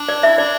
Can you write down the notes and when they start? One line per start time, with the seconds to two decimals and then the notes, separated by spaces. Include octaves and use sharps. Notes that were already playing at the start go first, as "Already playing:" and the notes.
Already playing: D4
0.09 D5
0.23 E4 E5
0.38 D4 D5